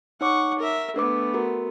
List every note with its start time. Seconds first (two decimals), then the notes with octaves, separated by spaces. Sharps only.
0.21 D#4 C#5 F#5 C#6 D6
0.59 A#4 E5
0.96 A3 B3 D4 B4 D6
1.34 F#4 A#4